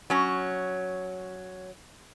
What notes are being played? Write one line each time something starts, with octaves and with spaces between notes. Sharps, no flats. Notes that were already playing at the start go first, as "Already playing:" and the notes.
F#3 C#4